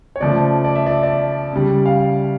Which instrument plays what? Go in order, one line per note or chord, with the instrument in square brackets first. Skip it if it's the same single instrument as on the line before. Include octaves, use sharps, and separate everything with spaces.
[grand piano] C#5
C#3 F3 A3 D5
D5
E5
D5
D5
C#3 G3
F5